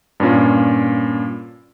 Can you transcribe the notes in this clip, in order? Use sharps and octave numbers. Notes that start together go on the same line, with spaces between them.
G2 A#2 C#4 F4